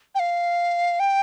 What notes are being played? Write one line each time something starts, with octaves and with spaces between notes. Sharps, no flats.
G5
F5
G5